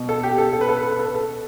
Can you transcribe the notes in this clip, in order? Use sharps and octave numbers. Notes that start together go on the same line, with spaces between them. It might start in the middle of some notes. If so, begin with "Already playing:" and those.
Already playing: B2
A4
G4
A4
A4
B4
A4
B4
A4
B4
A4
B4
A4